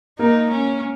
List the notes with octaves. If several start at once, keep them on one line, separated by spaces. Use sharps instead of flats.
A#3 D#4
C#4